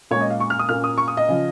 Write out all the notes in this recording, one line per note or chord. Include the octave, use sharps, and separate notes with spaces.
A#2 G#3 C#4 C#5
D#5
F5
C#6
F6
D#6
A#2 A#3 C#4 F6
D#6
C#6
D#6
D#5
C#3 F3